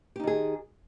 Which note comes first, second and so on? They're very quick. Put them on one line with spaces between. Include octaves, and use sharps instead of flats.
G4 D#4 D#3 G#4